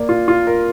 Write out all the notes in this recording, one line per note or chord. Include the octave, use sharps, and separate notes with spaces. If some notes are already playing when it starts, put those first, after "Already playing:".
Already playing: A#3 D5
F4
F4
A#4